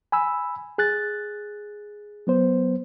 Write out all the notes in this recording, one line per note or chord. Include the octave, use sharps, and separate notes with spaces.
G#5 B5 E6
G#4 F#6 A6
F#3 B3 C5